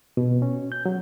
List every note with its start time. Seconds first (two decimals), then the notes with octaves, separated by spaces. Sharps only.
0.17 B2
0.42 C#4
0.72 G6
0.86 F#3